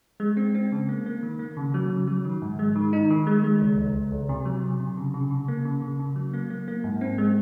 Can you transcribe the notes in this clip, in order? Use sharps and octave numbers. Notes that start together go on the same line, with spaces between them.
G#3
C4
C4
C#3
A#3
A#3
D#3
A#3
C#3
F#3
C#3
F#3
D#3
G#2
G#3
D#3
D#4
D#3
G#3
G#3
C#2
C#2
C#2
C#2
C3
F#3
C3
C3
C#3
C#3
C#3
A#3
C#3
C#3
C#3
F#3
A#3
A#3
A#3
G#2
C4
G#3